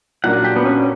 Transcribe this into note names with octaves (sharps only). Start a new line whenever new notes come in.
A#2 F#3 A#3 D4 F#5
G4
B3
C#4